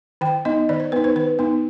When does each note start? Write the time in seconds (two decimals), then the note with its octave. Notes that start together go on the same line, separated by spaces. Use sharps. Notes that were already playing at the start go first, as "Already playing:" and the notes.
0.21 D#3 G5
0.45 B3 D#4 D#5
0.69 D#3 D5
0.80 C5
0.92 B3 D#4 B4
1.04 C5
1.16 D#3 B4
1.39 B3 D#4